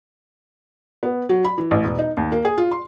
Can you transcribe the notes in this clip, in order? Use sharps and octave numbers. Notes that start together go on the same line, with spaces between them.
B3
F#3
B5
E3
A1
E1
D#4
D#2
A#3
G#4
F4
C6